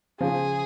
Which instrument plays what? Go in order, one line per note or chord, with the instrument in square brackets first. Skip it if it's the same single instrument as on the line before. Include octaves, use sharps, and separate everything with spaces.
[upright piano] C#3 F3 [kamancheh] G#4